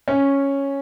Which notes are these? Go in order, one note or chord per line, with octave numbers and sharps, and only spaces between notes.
C#4